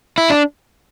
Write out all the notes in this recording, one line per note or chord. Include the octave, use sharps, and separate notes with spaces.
E4
D4